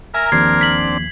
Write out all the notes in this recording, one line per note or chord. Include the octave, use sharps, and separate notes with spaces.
A#4 E5 G#5 A#5
D#2 F3 C4 D4 G#6 C7
B6 F#7